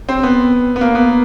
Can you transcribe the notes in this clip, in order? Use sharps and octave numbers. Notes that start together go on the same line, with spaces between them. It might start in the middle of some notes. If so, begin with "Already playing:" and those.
C4
B3
B3
A#3
B3